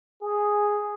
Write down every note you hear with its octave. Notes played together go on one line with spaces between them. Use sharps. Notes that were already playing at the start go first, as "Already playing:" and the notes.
G#4